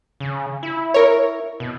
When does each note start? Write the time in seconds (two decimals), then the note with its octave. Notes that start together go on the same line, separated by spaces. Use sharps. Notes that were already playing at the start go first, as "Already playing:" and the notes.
0.20 C#3
0.63 E4
0.94 A#4 C#5
1.60 B2